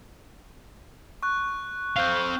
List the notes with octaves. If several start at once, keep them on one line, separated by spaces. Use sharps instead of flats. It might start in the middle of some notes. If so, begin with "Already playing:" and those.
C#6 F#6
C4 F5 F6 G6